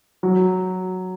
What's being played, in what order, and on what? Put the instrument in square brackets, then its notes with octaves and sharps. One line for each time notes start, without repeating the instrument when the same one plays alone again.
[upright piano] F#3